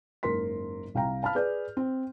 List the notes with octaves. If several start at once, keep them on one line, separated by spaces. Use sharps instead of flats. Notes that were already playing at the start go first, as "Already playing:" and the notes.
F#1 G#2 A#4 C6 B6
C2 F5 G5 A#5
F5 A5 B5 F6
G#4 B4 D5 G6
C4